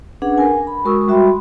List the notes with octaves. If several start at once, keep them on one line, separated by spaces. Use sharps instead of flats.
C#4 D4 G#4 B4 F#5
A#4 G#5
B5
G#3 F#4 A#4 C#6 D#6 E6
G3 F#4 E5 G5 B5 C6